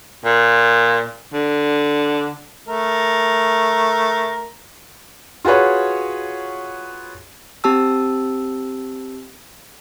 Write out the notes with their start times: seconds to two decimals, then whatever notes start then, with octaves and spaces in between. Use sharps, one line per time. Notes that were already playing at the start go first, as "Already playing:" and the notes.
0.25 A#2
1.33 D3
2.67 A3 A#4
5.45 F4 F#4 G#4 B4 C#5
7.64 C4 G4 A5 E6